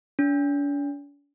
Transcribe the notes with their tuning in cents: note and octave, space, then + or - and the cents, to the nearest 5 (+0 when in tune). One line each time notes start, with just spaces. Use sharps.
D4 -45